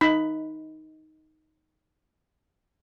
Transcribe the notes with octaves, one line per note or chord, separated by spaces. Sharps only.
D#4 B5